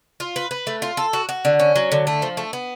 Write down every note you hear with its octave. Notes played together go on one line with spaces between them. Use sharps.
F4
B4
B4
A3
F4
A4
F#4
F#4
D3
C#4
F#3
D3
A3
F3
A3
B3